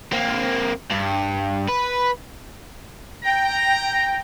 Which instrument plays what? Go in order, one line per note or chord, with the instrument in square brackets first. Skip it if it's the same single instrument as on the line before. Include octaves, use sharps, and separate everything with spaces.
[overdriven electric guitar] A#3 C4
G2
B4
[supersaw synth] G5 [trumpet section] A#5